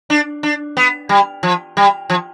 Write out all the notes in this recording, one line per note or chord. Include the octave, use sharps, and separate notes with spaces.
D4
D4
B3
G3
F3
G3
F3